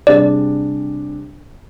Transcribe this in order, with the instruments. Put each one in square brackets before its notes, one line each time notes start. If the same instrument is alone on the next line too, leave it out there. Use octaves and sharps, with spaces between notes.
[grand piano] C3 G3 D4 G#4 [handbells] D5